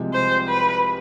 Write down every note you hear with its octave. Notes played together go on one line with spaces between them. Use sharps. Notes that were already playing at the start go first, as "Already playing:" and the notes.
Already playing: C2 C3 F3 G#3
C5
B4